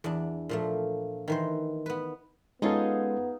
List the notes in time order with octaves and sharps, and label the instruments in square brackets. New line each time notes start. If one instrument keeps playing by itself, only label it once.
[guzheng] E2 D4
A#2 F3 A3
D#3 E3 C5
B3 B4
[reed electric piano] G#3 C#4 A4 [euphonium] B3 [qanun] D#4 F4 G#4